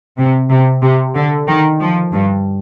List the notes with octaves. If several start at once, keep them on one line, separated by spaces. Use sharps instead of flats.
C3
C3
C3
D3
D#3
F3
G2